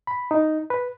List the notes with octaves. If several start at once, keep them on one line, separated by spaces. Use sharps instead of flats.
B5
D#4
B4